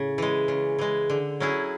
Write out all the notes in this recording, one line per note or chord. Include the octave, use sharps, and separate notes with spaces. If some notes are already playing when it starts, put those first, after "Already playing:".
Already playing: A2 C#3
E3 G#3
C#3
E3 G#3
D3
F#3 C#4 E4 G#4